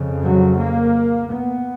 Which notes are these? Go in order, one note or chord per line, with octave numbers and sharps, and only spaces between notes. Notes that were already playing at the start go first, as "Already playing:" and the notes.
Already playing: F2 C#3
F#3
A#3
B3